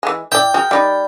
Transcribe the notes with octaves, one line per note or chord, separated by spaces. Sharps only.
E3 G#3
E4 D5 G5
F#4 G#4 A#4 F6
G3 D#4 D5 B5